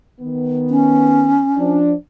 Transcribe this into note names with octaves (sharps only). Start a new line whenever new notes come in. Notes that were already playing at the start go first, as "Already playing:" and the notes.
D#3 B3
C#4
F3 D4